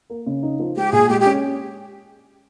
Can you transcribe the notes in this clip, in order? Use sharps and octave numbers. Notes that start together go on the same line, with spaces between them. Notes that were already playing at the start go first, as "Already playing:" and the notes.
A#3
C#3
D#4
F3
G#3 G4
A#2 G#4
G#3 G4
G4
C#4